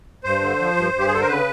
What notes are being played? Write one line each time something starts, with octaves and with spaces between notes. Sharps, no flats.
G2 C5
D3
F3
G2
G2
G4
G#4
D3 A4
A#4
C#3 B4